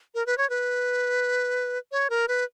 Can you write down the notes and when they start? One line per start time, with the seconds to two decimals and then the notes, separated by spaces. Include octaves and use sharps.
0.15 A#4
0.26 B4
0.38 C#5
0.50 B4
1.92 C#5
2.10 A#4
2.28 B4